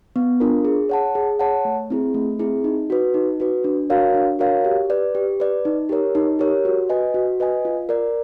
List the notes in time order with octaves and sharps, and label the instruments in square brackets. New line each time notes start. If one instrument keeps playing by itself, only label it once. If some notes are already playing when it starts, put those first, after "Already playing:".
[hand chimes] B3
D4 F4 A#4
G#4
C#5 F#5 A5
G#4
C#5 F#5 A5
A3
C4 E4 G#4
A3
C4 E4 G#4
D#4
F#4 B4
D#4
F#4 B4
D4
F#4 A#4 C#5 F5
D4
F#4 A#4 C#5 F5
G4
B4 D5
G4
B4 D5
D#4
G4 A#4 C#5
D#4
G4 A#4 C#5
F#4
B4 D#5 G#5
F#4
B4 D#5 G#5
F4
A#4 D5